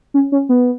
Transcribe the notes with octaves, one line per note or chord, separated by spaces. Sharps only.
C#4
C#4
B3